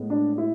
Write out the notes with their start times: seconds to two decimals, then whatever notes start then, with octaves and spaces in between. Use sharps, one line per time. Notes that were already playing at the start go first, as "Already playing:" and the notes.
Already playing: A2 G#3 B3
0.10 D4
0.38 E4